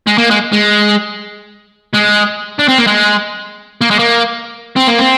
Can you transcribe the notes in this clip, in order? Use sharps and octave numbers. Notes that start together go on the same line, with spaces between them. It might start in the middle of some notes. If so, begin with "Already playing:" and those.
G#3
A#3
G#3
G#3
G#3
D4
C4
A#3
G#3
A#3
G#3
A#3
C4
A#3
C4